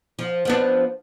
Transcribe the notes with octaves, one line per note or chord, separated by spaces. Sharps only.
F3
F3 B3 D4